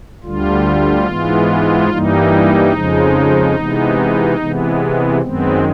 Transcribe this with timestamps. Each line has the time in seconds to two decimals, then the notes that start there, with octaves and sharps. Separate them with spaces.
0.24 D2 D3 G3 F4
1.06 G#2 E3 G#3 B3
1.90 G2 E3 G3 A#3 D#4
2.72 F2 C#3 F3 G#3
3.56 C3 E3 G#3 B3
4.38 C3 E3 G#3 B3
5.21 F#2 D#3 G#3 B3 C4